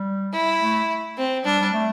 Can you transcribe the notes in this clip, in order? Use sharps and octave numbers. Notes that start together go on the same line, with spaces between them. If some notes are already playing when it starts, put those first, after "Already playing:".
Already playing: G3
E4
A3
C4
G3 D4
G3
A3